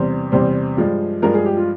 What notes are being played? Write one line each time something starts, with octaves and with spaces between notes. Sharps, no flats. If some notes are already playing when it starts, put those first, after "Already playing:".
Already playing: E2 C3 G3 C5
E2 C3 G3 C5
G2 F3 G#3
G2 F3 G#3 A#4
G#4
G4
F4